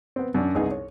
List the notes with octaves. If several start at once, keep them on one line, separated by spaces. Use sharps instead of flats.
B3 C4
F#2 D4
C2 B3 D#4 G#4
C#5